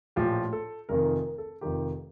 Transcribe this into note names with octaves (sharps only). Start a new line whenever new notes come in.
A#1 A2 F3 G4
A4
F1 F2 D#3 A#4
A#4
A4
F1 F2 D#3 G4